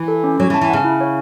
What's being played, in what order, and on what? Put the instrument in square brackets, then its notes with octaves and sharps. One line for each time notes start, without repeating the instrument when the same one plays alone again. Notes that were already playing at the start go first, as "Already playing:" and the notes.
Already playing: [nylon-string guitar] E3
[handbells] A4
C#4
[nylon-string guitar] F#3 [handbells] C#5
[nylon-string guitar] E3
[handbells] A5
[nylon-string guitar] E3
[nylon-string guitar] C#3 [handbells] F#5
[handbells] E4
C#5